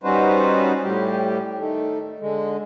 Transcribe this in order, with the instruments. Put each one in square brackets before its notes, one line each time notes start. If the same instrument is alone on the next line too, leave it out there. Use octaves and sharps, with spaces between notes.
[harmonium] G3 C#4 D#4 F#4 B4 C5
A2 G3 G4
D#3 A3
D3 G#3